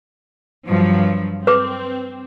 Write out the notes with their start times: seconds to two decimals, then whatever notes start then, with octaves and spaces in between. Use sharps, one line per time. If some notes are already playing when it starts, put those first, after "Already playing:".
0.66 G2 F3 F#3
1.47 C4 B4 D6